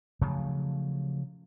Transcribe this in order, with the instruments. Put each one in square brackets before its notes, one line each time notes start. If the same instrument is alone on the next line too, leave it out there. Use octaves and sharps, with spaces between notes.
[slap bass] C#3 F3 F#3 A3